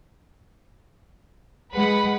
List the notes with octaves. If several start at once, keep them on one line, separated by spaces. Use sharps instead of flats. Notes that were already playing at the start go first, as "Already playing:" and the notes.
G#3 B4 F#5 B5